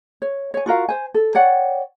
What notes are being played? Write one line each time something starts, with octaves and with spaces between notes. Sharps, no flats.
C#5
C#5 G#5
F4 F#4 A#4 F5
C5 G#5
A4
C#5 D5 F#5 G5